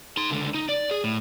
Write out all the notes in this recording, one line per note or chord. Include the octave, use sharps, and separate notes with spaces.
D#4 C6
C#2 D3
D#4
D5
G#4
A2